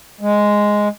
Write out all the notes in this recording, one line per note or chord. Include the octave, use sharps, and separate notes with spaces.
G#3